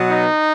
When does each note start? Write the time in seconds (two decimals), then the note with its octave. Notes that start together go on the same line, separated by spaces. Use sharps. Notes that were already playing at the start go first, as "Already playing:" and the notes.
Already playing: B2 F#3 B3
0.09 D#4